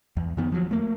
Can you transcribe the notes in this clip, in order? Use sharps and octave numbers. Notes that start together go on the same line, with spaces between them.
E2
F2 D#3 B3
F3 F#3
A3 A#3